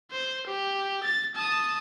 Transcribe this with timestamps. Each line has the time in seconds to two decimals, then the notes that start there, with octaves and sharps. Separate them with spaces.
0.12 C5
0.47 G4
1.04 A6
1.35 A5 D#6